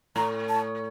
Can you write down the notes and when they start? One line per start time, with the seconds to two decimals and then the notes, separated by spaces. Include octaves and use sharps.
0.16 A2 A#5
0.49 A5